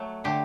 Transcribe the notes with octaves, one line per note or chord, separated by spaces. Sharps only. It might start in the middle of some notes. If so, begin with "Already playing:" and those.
Already playing: F#3 A3
D3 A3 G4